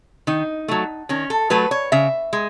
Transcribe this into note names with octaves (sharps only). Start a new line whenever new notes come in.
D#3 D#4
F#3 A3
D#3 C#4
A4
F#3 A3 B4
C#5
C#3 E5
G#3